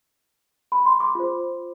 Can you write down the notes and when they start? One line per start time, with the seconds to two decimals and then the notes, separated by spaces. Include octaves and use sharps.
0.72 B5
0.86 C6
1.00 D6
1.15 F4 C5